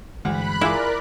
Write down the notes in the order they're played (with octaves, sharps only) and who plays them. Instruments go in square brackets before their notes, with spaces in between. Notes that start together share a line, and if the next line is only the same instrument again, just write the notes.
[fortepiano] D2 [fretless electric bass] G2 E3 G#3 [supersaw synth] B5 F#6
[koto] E4 [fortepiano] F4 G#4 D6 [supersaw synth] A#4 D5